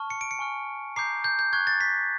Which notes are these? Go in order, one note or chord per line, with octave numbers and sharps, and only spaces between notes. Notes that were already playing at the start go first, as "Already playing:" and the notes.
Already playing: A5 C#6 F6
C#7
D7
C#7
G#5 C#6 F6
A#5 D6 G6 C7
G6
G6
C#6 F#6 G#6
A6
B6